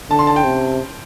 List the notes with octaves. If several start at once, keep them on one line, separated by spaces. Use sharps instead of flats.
D3 A5
C6
A5
G5
C3